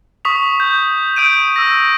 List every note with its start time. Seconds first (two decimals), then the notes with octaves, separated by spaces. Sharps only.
0.25 C#6 D#6 B6 F7
0.60 G6
1.16 D#6 G6 D7 D#7
1.56 E6 A#6